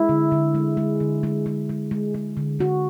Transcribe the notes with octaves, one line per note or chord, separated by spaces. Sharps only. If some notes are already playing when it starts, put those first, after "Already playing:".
Already playing: G#3 E4
D3
D3
G#3
G#3
D3
G#3
G#3
G#3
G#3
G#3
D3
D3 F#4